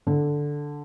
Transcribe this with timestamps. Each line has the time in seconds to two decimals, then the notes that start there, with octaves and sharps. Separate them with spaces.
0.07 D3